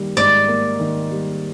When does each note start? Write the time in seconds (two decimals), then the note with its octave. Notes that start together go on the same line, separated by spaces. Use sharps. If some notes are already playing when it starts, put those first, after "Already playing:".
Already playing: D#3 G3 A#3
0.17 G#2 D5
0.48 A#3
0.80 D#3
1.11 G3